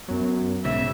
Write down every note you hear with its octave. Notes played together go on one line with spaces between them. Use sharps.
F#2 F#3 B3
B1 G#2 C#3 B3 E5